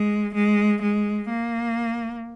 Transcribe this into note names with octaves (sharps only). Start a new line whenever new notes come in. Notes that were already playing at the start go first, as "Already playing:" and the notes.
Already playing: G#3
G#3
G#3
A#3